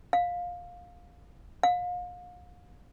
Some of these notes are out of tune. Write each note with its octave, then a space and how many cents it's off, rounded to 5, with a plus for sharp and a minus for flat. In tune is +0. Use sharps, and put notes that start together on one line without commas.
F5 +15
F5 +35